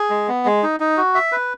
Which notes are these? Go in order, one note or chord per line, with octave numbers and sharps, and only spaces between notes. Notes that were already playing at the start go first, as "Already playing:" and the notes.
Already playing: G#4
G#3
B3
G#3
D#4
D#4
F#4
E5
B4